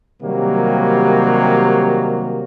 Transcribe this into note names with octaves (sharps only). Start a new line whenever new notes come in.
C3 D#3 F#3 G3 A#3